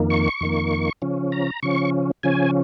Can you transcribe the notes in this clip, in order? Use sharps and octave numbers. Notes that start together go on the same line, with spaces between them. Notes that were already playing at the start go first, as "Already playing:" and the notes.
Already playing: F2 D#3 A#3
C#6
F2 D#3 A#3
C#3 F3 C#4
A#5
C#3 F3 C#4 C#6
C#3 F3 C#4 G#5